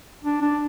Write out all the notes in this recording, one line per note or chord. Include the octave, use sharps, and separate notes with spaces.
D4
D4